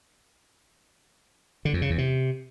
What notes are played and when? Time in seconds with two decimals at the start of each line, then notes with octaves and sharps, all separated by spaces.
1.65 D3
1.73 F2
1.82 C#3
1.90 E2
1.98 C3